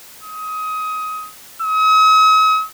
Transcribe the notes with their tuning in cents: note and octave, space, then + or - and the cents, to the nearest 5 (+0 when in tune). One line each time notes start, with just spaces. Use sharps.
D#6 +25
D#6 +45